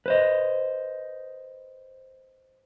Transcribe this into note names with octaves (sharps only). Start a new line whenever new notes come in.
B4 C5 D#5